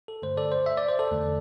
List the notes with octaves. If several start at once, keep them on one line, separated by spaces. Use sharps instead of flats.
A4
G2 D3 A3 C5
A4 D5
C5
E5
D5
C5
A4 D5
E2 D3 A3